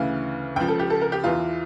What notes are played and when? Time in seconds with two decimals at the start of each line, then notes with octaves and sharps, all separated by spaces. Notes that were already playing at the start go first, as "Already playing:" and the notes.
Already playing: D2 C#3 E3 F5
0.56 C#2 C#3 F3 G5
0.68 A4
0.79 G4
0.90 A4
1.01 A#4
1.12 G4
1.24 E2 E3 F4